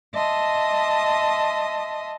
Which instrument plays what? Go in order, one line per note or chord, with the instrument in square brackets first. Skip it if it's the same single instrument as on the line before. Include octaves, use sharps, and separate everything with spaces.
[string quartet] D#5 E5 A5 C6 D#6